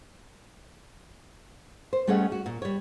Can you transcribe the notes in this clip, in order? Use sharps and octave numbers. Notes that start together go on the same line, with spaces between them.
C5
G3 A3 C#4 G#4 D#5 F#5
F#4
A#2
G3 C#5